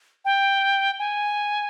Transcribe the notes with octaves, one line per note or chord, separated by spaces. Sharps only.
G5
G#5